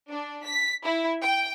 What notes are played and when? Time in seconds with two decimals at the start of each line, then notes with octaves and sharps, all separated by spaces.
0.11 D4
0.46 B6
0.84 E4
1.22 G5